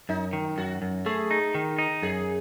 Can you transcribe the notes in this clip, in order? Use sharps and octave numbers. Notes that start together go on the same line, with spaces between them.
F#2 D#4
D#3
F#2 F#4
F#2
A3 G#4
D#4
D#3
D#4
F#2 G#4